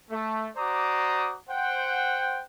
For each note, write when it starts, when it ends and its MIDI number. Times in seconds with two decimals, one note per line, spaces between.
0.11 0.48 57
0.57 1.36 66
0.57 1.36 72
0.57 1.36 74
0.57 1.36 82
0.57 1.36 86
0.57 1.36 87
1.49 2.42 72
1.49 2.42 78
1.49 2.42 79